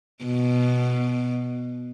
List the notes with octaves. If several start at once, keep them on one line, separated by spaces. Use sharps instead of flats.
B2